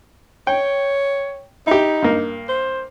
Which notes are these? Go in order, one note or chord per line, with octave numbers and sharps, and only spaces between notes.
C#5 G5
D#4 E4 G4
G2 A#3
C5